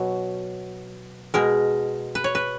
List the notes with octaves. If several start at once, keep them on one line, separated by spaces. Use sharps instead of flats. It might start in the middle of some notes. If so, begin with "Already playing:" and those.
Already playing: B2 F#3
B2 G#3 A#4
B4
C#5
B4